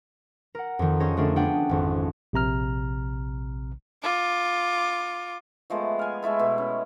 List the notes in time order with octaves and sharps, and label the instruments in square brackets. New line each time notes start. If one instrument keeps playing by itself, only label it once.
[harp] A#4 F#5
F2 D#3
C4 C#4 G#4 C#5 D#5
D3 A3 D4 G#4 A#4
B3 C#4 D4 G#4 F#5 G5
G#1 F2
[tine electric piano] A#1 C3 A#5 F6
[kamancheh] F4 D6
[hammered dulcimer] F3 G#3 A3 B3
F5 G#5
G#3 A3 E4 A4
B2
C#4